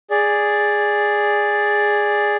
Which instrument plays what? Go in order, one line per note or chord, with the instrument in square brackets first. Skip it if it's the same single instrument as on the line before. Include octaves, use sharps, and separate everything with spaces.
[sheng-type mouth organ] G#4 D5